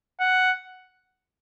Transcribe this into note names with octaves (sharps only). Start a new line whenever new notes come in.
F#5